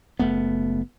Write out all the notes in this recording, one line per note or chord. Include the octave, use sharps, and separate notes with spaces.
F#1 E2 A3 B3